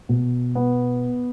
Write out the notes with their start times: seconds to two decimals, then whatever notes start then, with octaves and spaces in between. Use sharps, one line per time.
0.09 B2
0.55 B3